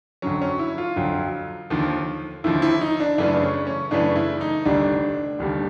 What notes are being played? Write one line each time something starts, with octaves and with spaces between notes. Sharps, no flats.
F2 D3 F#3 C#4
C#4
E4
F4
F2 D3 F#3
D#2 D3 F3
D#2 D3 F3 E4
E4
D#4
D4
F#2 C#3 E3 A3 D4
C#4
C#4
F#2 C#3 E3 A3 D4
E4
D#4
F1 D#2 D3 G3 D4
F1 D#2 D3 G3